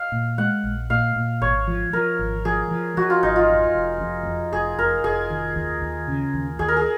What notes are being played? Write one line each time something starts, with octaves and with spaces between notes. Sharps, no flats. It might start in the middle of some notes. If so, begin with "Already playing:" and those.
Already playing: F5
A#2
G#3 F#5
A#1
A#2 F5
A#2
G#1 C#5
F3
F3 A#4
G#1
F3 G#4
F3
F3 F#4
F4
G#1 D#4
F4
F2
F1
F2
F2
F1 G#4
F1 A#4
F1 G#4
D#3
D#2
D#2
C#3
D#2
D#2 G#4
A#4
G#4